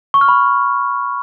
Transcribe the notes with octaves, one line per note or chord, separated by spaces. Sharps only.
C#6
F6
B5